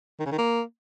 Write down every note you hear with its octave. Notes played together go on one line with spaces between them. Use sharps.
D#3
C#3
D#3
A#3